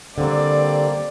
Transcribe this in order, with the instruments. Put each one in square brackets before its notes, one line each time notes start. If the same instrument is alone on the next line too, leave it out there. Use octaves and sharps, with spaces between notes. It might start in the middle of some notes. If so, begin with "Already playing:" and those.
[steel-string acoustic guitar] D3 G3 [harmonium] A#3 C4 [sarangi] D5